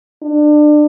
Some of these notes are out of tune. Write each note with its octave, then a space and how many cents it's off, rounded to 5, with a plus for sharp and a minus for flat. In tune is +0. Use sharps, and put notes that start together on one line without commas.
D4 +30